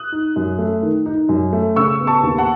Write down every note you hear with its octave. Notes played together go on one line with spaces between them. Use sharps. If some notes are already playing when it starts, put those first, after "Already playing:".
Already playing: D#6 F#6
D#4
F#2
A3
D#3
D#4
F#2
A3
C#3 C#6 E6
B3
A5 C#6
D#2
F#5 A5